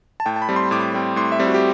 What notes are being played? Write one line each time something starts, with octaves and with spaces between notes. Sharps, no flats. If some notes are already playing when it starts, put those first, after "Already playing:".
A5
A2 G5
A5
B5
G3 C4
C6
A2 D6
G3 C4
A2 C6
E5
G3 C4
F#4
G4